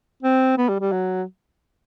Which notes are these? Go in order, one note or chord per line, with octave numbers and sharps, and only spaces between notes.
C4
B3
G3
G3
F#3